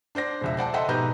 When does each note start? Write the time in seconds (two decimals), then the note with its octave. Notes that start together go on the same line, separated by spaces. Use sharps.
0.15 D4 C5 D5 A#6
0.41 E1 C#2 E5
0.57 C5 D5 F#5 A5
0.74 A4 D#5 E5 F#5 G5 C6
0.88 G#2 B2 G4 B4 A#5 G6